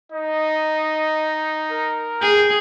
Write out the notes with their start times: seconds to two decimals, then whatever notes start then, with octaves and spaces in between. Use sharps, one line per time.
0.12 D#4 D#5
1.71 A#4
2.22 G#4 G5